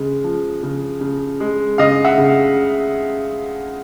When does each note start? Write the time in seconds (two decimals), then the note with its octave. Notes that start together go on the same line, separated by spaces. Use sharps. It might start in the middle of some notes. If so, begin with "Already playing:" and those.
Already playing: C#3 G#3
0.24 F3
0.63 C#3
1.01 C#3
1.40 G#3
1.78 C#3 D#5 F5
2.04 E5 F#5
2.18 C#3